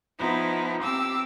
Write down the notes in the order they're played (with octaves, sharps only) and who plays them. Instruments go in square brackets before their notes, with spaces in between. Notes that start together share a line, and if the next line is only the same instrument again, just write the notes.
[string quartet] F3 B3 D#4 E4
C4 G4 D6 E6